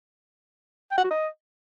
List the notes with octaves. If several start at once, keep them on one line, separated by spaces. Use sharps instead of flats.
G5
F#5
F#4
D#5